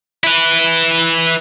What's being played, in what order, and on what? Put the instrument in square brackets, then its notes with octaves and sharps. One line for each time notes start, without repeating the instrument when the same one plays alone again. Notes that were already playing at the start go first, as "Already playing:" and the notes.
[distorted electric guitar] E4 B4